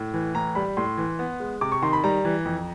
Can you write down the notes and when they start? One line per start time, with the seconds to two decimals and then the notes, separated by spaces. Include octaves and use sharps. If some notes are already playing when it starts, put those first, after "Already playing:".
Already playing: A2
0.14 E3
0.35 A2 A#5
0.55 G3 B5
0.77 A2 C6
0.98 E3
1.19 B3
1.40 G#3
1.61 C3 D6
1.72 C#6
1.83 D#3 C6
1.93 B5
2.04 G3 A#5
2.25 E3
2.46 F2